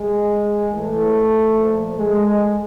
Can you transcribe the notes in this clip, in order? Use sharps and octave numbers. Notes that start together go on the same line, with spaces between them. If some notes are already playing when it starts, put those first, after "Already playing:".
Already playing: G#3
A2 E3 A3
A#2 F3
G#3